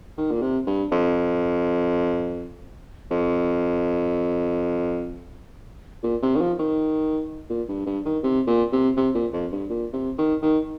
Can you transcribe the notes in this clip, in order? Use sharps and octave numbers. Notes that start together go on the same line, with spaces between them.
D#3
A#2
C3
G2
F2
F2
A#2
C3
D#3
F3
D#3
A#2
G2
G2
D#3
C3
A#2
C3
C3
A#2
F2
G2
A#2
C3
D#3
D#3